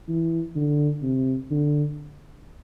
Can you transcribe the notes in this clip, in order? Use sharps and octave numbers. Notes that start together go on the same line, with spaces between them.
E3
D3
C3
D3